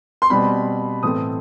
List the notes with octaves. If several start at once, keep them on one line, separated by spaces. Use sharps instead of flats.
C6
B2 G3 C4 B5
A2 E3 A3 C4 D#6